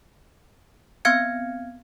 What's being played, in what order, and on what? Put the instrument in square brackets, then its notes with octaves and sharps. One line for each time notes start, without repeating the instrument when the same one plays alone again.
[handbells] B3 C4 F5 F6 G#6 C#7